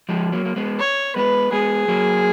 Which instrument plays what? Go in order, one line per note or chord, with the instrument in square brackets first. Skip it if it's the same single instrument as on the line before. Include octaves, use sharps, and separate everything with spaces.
[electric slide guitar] F3 G#3
F#3 A#3
A#3
G#3 B3
[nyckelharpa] C#5
[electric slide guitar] G#3 B3 [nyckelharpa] B4
[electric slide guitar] G#3 B3 [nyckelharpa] G#4
[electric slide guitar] F#3 A#3